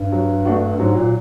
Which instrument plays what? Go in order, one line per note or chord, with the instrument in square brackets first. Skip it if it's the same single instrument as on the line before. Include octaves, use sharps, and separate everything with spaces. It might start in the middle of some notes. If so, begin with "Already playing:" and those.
Already playing: [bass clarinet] G2
[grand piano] F#3
A3 D4 F#4
[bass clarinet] G#2 [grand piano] F#3
[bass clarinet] A#2